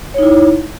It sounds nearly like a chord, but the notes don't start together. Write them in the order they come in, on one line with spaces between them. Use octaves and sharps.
C#5 D#4 E4